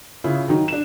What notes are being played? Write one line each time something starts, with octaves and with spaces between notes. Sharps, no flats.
C#3 E4 F4 G#4
D#3 F#3 D#4
D4 E7